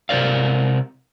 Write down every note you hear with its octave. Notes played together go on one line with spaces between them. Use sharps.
C3 A#4 C5 D5 F5